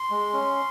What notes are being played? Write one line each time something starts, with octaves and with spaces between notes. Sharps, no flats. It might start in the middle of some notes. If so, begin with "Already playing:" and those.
Already playing: C6
G#3
C#4